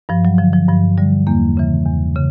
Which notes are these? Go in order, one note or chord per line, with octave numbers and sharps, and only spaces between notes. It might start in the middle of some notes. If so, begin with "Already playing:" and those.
G2 F3
F#3
D3 F3
F3
G2 F3
D3 G3
E2 A#3
C#3 E3
E2
C#3